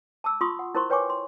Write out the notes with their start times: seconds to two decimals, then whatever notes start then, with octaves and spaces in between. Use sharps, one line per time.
0.24 A5 D6 E6
0.41 F4 C6 C#6 D#6
0.59 F#5
0.75 E4 A#4 C5 A#5 C6 C#6
0.90 B4 C#5 G5 G#5 C#6 D6
1.10 C6